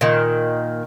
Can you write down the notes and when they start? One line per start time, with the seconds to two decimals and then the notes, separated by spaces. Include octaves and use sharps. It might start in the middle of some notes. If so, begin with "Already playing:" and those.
0.01 A#2 D#3